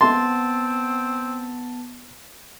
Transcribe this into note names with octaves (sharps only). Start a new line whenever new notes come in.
B3 C4 A5 C6 A6